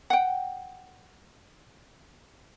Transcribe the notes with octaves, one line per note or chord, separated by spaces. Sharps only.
F#5 G5